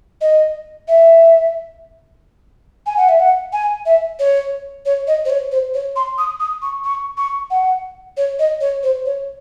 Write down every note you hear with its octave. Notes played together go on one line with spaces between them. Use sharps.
D#5
E5
G#5
F#5
E5
F#5
G#5
E5
C#5
C#5
D#5
C5
C#5
C5
C#5
C6
D#6
D#6
C#6
C#6
C#6
F#5
C#5
D#5
C#5
C5
C#5